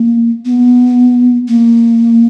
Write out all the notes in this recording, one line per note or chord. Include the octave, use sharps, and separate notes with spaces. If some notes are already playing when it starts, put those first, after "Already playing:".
Already playing: A#3
B3
A#3